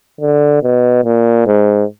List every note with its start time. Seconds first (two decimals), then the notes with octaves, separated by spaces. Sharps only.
0.21 D3
0.63 B2
1.05 A#2
1.46 G#2